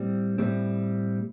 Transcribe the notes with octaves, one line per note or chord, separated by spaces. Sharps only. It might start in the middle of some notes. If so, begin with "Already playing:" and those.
Already playing: A2 G3 C4
A2 G3 C4